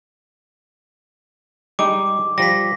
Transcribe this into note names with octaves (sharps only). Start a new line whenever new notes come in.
G3 G#3 D#4 D6
F3 G3 A#6 B6